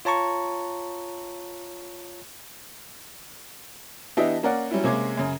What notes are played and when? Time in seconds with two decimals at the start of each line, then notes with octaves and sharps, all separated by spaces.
0.05 F4 C#5 A5 A#5 C#6
4.17 E3 B3 D4 G4 D#5 E5
4.43 A#3 C#4 A#4 D5 F#5
4.71 F#3 G3 C#4 E4
4.84 C3 G#3 A#3 C#4 D6 G#6
5.17 F#2 C#3